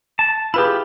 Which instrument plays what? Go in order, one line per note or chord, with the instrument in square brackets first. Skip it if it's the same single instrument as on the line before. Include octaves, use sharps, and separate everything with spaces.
[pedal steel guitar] A5
[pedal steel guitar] E4 F4 G4 [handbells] G#4 B4 B5